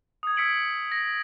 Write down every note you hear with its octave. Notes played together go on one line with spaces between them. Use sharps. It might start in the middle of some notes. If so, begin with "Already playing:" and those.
D#6 G#6
E6 G#6 B6 C#7 D7 F#7
A#6